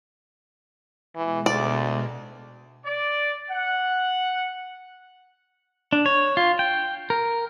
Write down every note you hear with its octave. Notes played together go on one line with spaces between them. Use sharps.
B2 E3 G#3
D2 D5
D5
F#5
D4
C#5
F4
G5
A#4